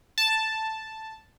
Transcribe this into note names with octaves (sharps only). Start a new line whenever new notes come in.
A5